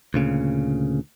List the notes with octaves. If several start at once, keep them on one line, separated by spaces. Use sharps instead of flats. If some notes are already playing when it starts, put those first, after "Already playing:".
D2 A#2 C#3